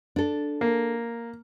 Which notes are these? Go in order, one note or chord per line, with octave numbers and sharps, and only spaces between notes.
D4 A4
A#3